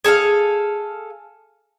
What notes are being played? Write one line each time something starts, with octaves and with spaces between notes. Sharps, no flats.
G#4 A4 D#5 F5